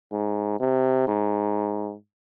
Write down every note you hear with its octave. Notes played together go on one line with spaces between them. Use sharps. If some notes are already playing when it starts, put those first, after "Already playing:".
G#2
C3
G#2